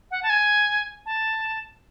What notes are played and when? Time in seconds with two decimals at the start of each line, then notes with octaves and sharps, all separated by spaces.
0.11 F#5
0.23 A5
0.30 G#5
1.06 A5